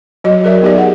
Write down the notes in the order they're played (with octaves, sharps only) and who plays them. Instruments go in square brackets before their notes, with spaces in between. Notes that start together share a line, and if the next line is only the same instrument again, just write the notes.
[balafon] F#3 F#4 D#5
G#4 A#4 D5 E5
B3 D#4 G4 G#4 D5
F#5